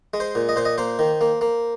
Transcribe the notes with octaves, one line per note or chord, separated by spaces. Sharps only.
G#3
C5
A#2
D#5
A#2 C5
D#5
A#3 C5
D#3
A#3
A#3